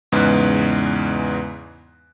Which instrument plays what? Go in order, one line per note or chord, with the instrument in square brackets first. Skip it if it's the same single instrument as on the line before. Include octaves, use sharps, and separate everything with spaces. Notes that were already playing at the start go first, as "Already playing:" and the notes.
[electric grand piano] E2 G#2 C#3 G#3 B4 F#6